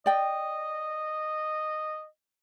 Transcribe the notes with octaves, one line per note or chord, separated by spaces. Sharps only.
D5 D#5 G5